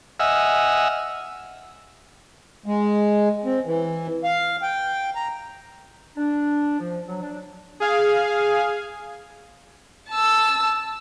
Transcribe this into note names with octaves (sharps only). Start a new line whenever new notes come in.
D#5 E5 F#5 G#5 E6 F6
G#3
C4
E3
F5
G5
A#5
D4
F3
F#3
D4
G#4 F5 G#5
A5 E6